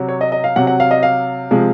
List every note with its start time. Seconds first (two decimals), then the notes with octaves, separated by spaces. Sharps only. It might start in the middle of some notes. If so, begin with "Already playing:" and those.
Already playing: C3 F#3
0.09 C#5
0.21 D#5
0.32 D#5
0.44 F5
0.56 C3 F#3 F#5
0.67 F#5
0.80 F5
0.91 D#5
1.03 F5
1.51 C3 F3 G#3